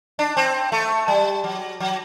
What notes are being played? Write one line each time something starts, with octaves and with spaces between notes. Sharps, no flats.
D4
C4
A3
G3
F#3
F#3